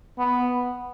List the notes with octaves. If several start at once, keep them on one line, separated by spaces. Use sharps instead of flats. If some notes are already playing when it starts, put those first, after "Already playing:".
B3